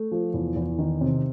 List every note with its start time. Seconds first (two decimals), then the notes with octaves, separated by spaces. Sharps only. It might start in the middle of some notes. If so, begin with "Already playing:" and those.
Already playing: A3
0.11 F3
0.34 E2
0.56 E2
0.78 D#3
1.01 C3